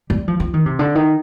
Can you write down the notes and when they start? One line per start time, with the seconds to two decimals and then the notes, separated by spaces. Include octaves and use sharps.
0.10 G3
0.28 F3
0.40 F3
0.54 D#3
0.66 C3
0.79 D3
0.95 D#3